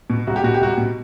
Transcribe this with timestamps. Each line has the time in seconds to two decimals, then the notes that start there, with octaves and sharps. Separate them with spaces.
0.10 B2
0.27 C2 F#4
0.36 G4
0.44 B2 F#4
0.54 G4
0.61 C2 F#4
0.78 B2